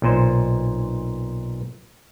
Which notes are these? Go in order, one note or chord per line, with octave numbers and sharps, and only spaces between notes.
B1 A#2 C5